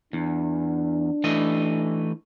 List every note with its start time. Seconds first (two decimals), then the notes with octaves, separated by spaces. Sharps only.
0.13 E2 D4
1.24 E3 A3 D#5